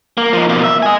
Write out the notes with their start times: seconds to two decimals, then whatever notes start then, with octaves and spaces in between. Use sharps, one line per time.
0.17 A#3
0.33 F3 D#4
0.49 B2 A#3
0.64 E5
0.83 D#5 G#5